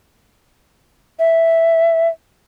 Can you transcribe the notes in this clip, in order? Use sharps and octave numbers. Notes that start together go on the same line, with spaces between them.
E5